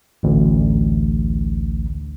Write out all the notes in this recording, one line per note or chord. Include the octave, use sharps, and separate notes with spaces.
A1 D2